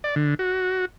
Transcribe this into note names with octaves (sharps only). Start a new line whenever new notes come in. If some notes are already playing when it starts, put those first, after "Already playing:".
D5
D3
F#4